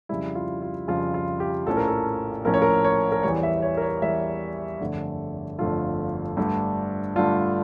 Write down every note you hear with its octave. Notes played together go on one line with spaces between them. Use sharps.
F2 C#3 G3 E4
F4
F4
F2 C#3 G3 F4
F4
G4
A#1 A2 F3 C#4 A4
A#4
A4
A#1 A2 F3 C#4 A#4
C#5
A#4
C#5
A#4
E2 E3 G3 C#5
E5
C#5
A#4
C#5
E2 E3 G3 E5
G1 F2 D3 A3
G1 F2 D3 A3 F4
G2 D3 A3 D4
G2 D3 A3 D4 F4